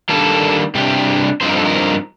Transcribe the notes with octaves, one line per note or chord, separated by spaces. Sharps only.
D#3 G3 A#3 D4 A4
C3 G3 D4 G4
G2 F3 C4 D#4 C5
A#4
A4
A#4